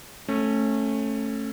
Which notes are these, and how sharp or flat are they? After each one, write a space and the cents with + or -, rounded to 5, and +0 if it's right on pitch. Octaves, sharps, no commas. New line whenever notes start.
A3 +0 C#4 -20